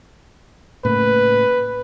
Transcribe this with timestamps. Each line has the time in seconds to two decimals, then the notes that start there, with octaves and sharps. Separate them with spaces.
0.85 A2 C#3 A#3 B4